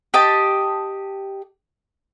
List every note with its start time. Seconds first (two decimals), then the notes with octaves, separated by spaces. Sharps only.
0.14 G4 D#5 A5